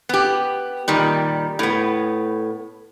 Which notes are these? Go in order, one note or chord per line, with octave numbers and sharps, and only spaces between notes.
B3 G4
A#2 D#3 G3
A2 B3